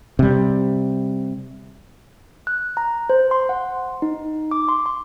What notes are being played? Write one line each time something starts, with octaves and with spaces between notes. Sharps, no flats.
C3 G3
F#6
A#5
C5
C6
F#5
D#4
D6
C6
C6